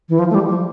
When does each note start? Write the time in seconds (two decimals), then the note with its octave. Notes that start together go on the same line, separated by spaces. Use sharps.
0.09 E3
0.19 F3
0.30 A3
0.35 G3
0.49 F3